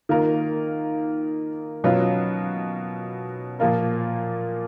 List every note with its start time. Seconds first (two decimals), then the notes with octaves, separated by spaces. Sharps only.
0.09 D#3 A#3 F4 A#4
1.84 B2 F#3 C#4 F4 B4
3.59 A#2 F3 A#3 F4 A#4